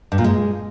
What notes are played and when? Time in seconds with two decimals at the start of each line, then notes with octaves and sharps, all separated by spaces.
0.12 G2
0.18 A#2
0.24 G#3